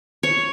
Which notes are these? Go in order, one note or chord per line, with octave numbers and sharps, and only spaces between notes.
C#5